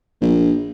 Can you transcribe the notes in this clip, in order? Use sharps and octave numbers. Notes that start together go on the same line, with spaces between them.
A#1